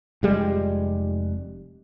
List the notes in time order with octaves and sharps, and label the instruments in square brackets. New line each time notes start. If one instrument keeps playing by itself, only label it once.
[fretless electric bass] F1 G3 G#3